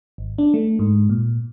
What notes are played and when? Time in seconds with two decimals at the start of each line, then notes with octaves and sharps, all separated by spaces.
0.18 G#1
0.38 D4
0.54 A3
0.79 G#2
1.10 A#2